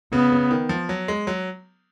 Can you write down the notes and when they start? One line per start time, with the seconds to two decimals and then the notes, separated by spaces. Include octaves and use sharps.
0.13 C#3 B3
0.32 C#3
0.51 D#3
0.69 F3
0.89 F#3
1.08 G#3
1.27 F#3